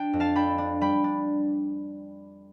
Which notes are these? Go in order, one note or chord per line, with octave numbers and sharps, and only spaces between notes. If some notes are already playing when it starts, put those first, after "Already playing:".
Already playing: D4 G5
F2
F5 A5
D4 G5 B5
D4
G3 G5 B5
D4